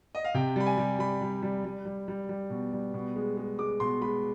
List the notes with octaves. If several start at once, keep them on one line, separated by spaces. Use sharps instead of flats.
D#5
F5
C3 G5
G3 B5
G#5
G3
G3 B5
G3
G3
G3
G3
G3
G3
B2
G3
B2
G#3
G#3
G#3 D6
B2 C6
G#3 B5